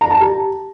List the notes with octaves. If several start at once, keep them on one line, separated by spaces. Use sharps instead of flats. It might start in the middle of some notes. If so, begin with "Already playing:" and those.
A#5
A5
G4